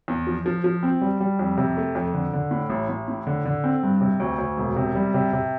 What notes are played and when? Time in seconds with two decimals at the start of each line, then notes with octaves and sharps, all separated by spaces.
0.08 E2
0.27 F3
0.46 F3
0.64 F3
0.83 C4
1.01 G3
1.20 G3
1.39 F2
1.57 C3
1.77 A3
1.95 F2
2.14 D3
2.33 D3
2.51 A2
2.70 A1
2.89 A1
3.08 A2
3.27 D3
3.46 D3
3.64 C4
3.83 G2
4.01 C3
4.20 D2
4.38 D2
4.57 E1
4.76 C3
4.95 G3
5.14 C3
5.33 C3